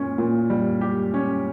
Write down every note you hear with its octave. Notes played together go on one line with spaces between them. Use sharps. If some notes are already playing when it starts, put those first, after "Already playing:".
Already playing: A#2 C#4
A#2
G3
G4
C#4